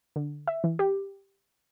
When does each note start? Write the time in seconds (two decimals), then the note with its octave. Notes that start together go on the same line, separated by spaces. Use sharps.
0.16 D3
0.47 E5
0.64 E3
0.79 G4